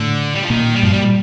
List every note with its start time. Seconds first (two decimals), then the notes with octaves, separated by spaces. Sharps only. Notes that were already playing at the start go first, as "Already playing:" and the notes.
Already playing: A2 D3
0.35 G3
0.43 F3
0.50 A#2 D#3
0.75 G3
0.83 G2 F3
0.93 A#2 G3